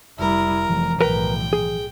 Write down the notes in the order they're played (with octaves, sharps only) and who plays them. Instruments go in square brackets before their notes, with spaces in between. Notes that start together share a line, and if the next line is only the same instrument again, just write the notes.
[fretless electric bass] F1 [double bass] G3 E4 [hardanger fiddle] A#4
[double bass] F1 [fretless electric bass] E3 F3
[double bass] B1 A2 [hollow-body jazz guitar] A#4 B4 A#5 [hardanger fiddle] G5
[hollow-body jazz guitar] G#4